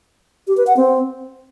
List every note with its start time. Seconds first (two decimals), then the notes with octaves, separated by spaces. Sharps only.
0.47 G4
0.57 B4
0.67 F#5
0.77 C4